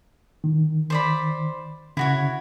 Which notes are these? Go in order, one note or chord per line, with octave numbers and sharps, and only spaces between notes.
D#3
C5 D5 B5
C#3 E4 F#4 C#5